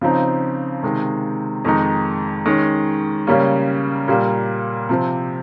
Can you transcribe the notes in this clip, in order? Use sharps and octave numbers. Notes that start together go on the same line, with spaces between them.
C#3 F3 C4 D#4
C3 D#3 G#3
F2 D#3 G#3 D#4
D#3 G#3 C#4
C#3 G3 A#3 C#4
A#2 G3 A#3
C3 F3 C4